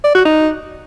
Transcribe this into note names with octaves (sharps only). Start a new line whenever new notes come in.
D5
F#4
D#4